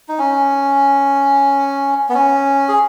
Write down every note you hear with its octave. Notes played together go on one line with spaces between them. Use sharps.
D#4
C#4
B3
C#4
G#4